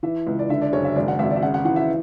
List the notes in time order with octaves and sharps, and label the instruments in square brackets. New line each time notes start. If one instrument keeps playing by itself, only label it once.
[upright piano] E3 E5
C#2
D5
D3 E5
D5
F#1 C#5
E5
G#1 D5
F#5
G#1 E5
D5
E5
C#3 F#5
F#5
E3 F#5
E5